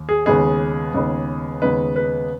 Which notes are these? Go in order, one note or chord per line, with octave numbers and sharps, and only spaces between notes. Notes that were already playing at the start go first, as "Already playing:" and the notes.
Already playing: D#2
G#4
D#2 C#3 G#3 B3 D#4 G#4
D#2 C#3 G#3 B3 D#4
D#2 C#3 G#3 B3 D#4 B4
B4